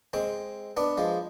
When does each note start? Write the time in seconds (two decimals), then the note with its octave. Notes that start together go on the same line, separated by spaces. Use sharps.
0.13 G#3 C4
0.77 B3 D4
0.97 F3 G#3